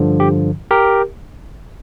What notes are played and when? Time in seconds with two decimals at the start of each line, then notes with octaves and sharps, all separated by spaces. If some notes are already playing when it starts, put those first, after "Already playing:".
Already playing: G2 D3 F3
0.20 G4
0.71 G4 A#4